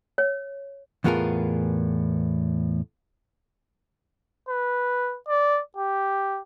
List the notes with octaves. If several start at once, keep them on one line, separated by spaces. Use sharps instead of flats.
C#5
E2 A2 B3 F4 G#4 A#4
B4
D5
G4